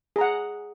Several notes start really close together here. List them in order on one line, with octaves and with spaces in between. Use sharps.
G#4 A#5 F#5